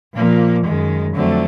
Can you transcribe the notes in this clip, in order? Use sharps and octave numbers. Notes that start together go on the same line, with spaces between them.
A#2 F3 A#3
F#2 D#3 G#3
F2 D3 F#3 A3 C4